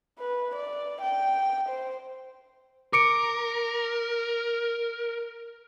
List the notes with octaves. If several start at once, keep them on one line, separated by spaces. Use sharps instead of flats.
B4
D5
G5
C5
A#4 D6 C#7 D7